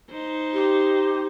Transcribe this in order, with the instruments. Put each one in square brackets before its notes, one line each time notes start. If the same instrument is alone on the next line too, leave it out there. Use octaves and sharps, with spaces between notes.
[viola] D#4 C5
[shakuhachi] G4